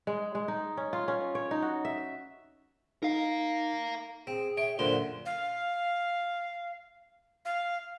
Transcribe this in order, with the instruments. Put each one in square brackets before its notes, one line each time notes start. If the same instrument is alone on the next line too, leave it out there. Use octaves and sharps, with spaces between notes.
[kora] G#3
G#3
D#4
C#4
F4
C#4
C#5
D#4
F#4
E5
[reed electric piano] D#4 [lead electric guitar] A#4 F5
[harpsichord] C4 [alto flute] G#4
[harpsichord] C#5 [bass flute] E5 [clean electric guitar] G5
[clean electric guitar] F#2 C6 [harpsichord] A#2 D3 [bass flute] C5 [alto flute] F#5
[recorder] F5
F5